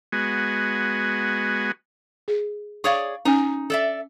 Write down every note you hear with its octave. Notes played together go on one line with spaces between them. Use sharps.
G#3 B3 F#4 G#5
G#4
G#4 C#5 D5 F5 C#6
C#4 D#4 G#5
A4 D5 E5